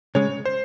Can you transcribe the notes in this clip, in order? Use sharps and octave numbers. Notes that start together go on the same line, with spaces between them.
C#3 G#3 C#5
C5